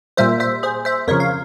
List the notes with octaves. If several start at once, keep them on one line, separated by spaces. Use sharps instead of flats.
A#2 G3 A#3 C5 E5
C5 E5
G#4 C5
C5 E5
F2 C#3 F3 A#4 C#5
F5